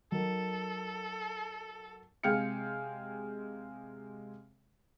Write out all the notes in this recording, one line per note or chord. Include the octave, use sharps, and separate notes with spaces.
F#3 D#4 A4 A#4
C3 G#3 F5 G5 F6 C#7